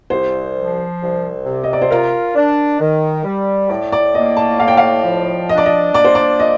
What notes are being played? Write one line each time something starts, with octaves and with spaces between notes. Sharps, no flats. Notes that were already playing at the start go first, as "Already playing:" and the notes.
C2 C5
F3
C2
C3
D#5
D5
C5
F4 A#4
D4
D#3
G3
A2 D5
D5
A#3 D#5
A5
A2 F5
G5
F5
F3
D4 D#5
D5
D#5
A#3 D5
C5
D5
A#2 D#5